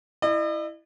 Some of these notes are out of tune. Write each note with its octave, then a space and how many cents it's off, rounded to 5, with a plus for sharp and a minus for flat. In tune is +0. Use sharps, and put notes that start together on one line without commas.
E4 +0 D#5 -45